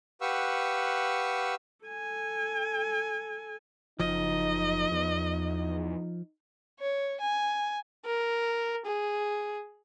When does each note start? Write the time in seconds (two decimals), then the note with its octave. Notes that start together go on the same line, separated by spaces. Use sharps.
0.21 G4 B4 F5 F#5 C#6 E6
1.85 A4 G#5
4.00 F#1 F3 D#4 D#5
4.91 E2 D#4
6.80 C#5
7.21 G#5
8.06 A#4
8.85 G#4